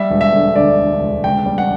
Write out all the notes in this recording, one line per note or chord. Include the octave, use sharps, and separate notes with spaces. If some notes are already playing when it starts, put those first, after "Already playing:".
Already playing: G3 E5
E1
E5
D3
D2 D5
D3
E1
C#2 G5
G3
F#5